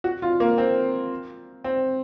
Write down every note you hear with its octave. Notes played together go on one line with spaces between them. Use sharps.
F#4
F4
A#3
C4
C4